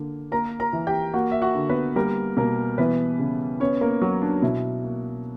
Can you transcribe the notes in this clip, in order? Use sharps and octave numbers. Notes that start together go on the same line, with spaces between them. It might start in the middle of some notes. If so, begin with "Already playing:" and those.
Already playing: D3 A#3
A#3 A#4 A#5
A#4 A#5
E3
G4 G5
A#3 F#4 F#5
E5
F#4 F#5
D3
B3 B4
G3 A#3 A#4
B2 A#3 A#4
E3 B3 B4
C#3
B3 C#4 C#5
A#3 A#4
F#3 F#4
D4
B2 E4
A#3